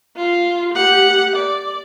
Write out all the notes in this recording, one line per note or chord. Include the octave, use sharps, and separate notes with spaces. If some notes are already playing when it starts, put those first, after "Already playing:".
F4
G4 F#5
D5